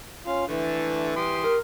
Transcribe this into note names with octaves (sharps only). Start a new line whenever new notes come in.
C#4 F4 F5
D3 E3 A3
G4 C6 D#6
A#4